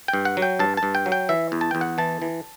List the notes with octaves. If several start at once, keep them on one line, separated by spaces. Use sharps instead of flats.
G5
G2
F#5
F#3
G5
G2 A5
A5
G2
G5
F#3
G5
E3 E5
E2
A5
E2 G5
F#5
E3 A5
E3